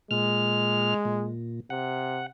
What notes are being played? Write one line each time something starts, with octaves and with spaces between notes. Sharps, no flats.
A#2 G#3 F6
A#2
C3 F#5